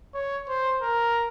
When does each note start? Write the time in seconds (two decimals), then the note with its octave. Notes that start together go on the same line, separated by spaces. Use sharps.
0.14 C#5
0.48 C5
0.82 A#4